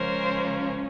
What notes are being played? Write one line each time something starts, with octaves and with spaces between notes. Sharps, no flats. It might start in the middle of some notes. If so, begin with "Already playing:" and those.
Already playing: C#3 F3 G#3 C#4 A#4 C5